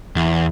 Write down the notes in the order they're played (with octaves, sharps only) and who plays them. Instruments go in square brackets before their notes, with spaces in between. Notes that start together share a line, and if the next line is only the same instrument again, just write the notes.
[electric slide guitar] E2